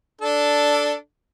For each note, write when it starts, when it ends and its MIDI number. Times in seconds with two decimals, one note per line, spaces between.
0.21 0.93 62
0.21 0.93 69